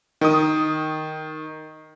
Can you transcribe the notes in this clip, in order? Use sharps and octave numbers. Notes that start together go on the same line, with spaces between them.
D#3 D#6